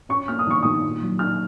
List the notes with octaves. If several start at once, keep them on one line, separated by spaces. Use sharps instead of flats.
C#4 C#6
A#3 F6
D#6
D#3 C#6
D#3 D#6
A#2
F#3
D#4 F6